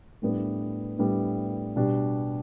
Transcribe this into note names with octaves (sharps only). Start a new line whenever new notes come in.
A2 G3 B3 D4
A2 G3 B3 D4
B2 G3 D4 G4